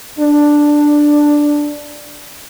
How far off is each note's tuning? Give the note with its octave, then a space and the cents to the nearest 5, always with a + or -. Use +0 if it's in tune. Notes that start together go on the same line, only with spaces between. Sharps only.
D4 +5